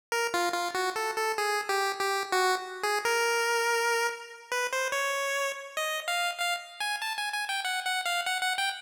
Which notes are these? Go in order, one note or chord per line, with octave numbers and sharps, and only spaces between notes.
A#4
F4
F4
F#4
A4
A4
G#4
G4
G4
F#4
G#4
A#4
B4
C5
C#5
D#5
F5
F5
G#5
A5
G#5
G#5
G5
F#5
F#5
F5
F#5
F#5
G5